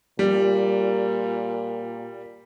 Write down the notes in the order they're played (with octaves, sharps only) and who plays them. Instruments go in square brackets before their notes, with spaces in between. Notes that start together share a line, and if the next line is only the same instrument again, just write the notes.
[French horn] A#2 [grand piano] G3